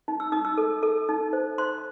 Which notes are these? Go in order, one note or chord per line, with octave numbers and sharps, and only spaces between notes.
D#4
E6
D#4 D#6
E6
A4
A4
D#4
C5
C5 C6